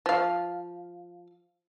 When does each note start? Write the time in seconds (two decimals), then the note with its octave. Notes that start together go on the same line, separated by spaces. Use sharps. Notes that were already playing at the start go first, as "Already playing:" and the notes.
0.06 F3 F5